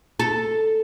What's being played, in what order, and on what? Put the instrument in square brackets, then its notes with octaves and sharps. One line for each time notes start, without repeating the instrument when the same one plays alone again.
[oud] A4